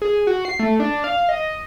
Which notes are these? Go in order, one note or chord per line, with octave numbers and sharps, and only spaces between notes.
G#4
F#4
C7
A3
D4
F5
D#5